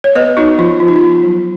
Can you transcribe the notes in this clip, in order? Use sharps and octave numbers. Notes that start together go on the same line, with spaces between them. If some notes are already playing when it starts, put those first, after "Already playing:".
C#5
B3 B4 D#5
B3 D#4 F#4
F3 F4
F3 F4
D#4
F4
B3
F#3